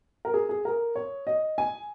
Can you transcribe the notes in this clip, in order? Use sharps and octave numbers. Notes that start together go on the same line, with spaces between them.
A#4
G#4
G#4
A#4
C#5
D#5
G#5